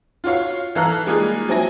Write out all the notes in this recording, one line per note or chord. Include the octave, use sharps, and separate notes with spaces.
F4 F#4 C#5 F5
E3 A4 F5 A#5 F6 F#6
G3 G#3 A#3 D#4 F4 G#4
F#3 C4 E4 G#5 A#6